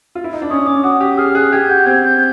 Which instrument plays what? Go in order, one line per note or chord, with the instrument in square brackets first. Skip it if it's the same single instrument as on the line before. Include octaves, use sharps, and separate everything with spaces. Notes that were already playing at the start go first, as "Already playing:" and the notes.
[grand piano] F4
E4
D#4
D4
[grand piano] C#4 [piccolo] D#6
[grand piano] C#4 [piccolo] D6
[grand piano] F#4 [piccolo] D#6
[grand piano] G4 [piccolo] D#6
[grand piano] G#4 [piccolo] F6
[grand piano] G#4 [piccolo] F#6
[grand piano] G4 [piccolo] G#6
[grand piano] F#4 [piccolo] G6
[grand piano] C4 [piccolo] G#6
[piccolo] G6